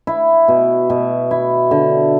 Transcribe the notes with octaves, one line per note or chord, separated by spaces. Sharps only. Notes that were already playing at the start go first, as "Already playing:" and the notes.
E4
B2
B2
E4
D3